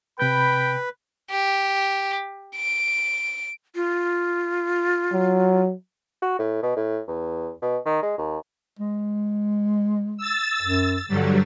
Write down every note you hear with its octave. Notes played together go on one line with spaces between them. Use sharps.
C3 B4 G5 B5 G6
G4
D7
F4
F#3
F#4
A2
B2
A2
E2
B2
D#3
G#3
D#2
G#3
E6 A6
F#2
G2 D3 F#3 G3